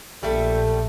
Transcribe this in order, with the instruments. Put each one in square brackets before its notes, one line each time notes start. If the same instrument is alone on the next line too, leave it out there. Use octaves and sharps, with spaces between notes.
[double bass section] A#1 [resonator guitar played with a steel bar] G3 A3 [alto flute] A4